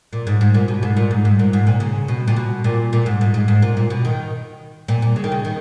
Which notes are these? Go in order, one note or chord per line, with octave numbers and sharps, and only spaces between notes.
A#2
G#2
G#2
A#2
B2
G#2
A#2
G#2
G#2
A#2
G#2
A#2
C#3
B2
A#2
B2
A#2
A#2
G#2
G#2
G#2
G#2
A#2
A#2
B2
D#3
A#2
A#2
C#3
D#3
C#3
D#3